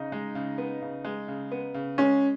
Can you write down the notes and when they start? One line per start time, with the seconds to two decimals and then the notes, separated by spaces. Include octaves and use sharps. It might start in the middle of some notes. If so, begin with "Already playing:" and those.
Already playing: C#3 D#4
0.12 G#3
0.35 C#3
0.58 B3
0.82 C#3
1.05 G#3
1.28 C#3
1.51 B3
1.74 C#3
1.98 G#3 C#4